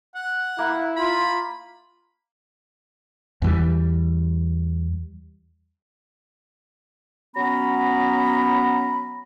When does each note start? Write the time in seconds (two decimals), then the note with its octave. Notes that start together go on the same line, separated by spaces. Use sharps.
0.15 F#5
0.59 A#3 E4
0.96 F4 B5
3.42 E2 E3 G3
7.36 F#3 B3 C#4 A#5 B5